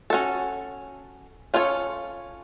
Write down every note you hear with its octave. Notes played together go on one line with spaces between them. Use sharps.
C#4 F#4 A4
C#4 F4 A4 C#5